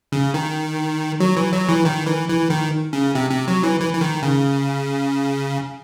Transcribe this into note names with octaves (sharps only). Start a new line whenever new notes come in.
C#3
D#3
F#3
E3
F#3
E3
D#3
E3
E3
D#3
C#3
C3
C3
F#3
E3
E3
E3
D#3
C#3